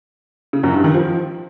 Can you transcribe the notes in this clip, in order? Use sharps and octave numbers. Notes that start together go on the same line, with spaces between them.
C#3
F#2
G2
D#3
F3